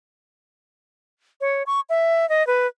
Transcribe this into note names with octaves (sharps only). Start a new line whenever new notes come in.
C#5
C#6
E5
D#5
B4